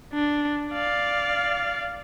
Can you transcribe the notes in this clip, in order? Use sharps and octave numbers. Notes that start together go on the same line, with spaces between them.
D4
D5 F5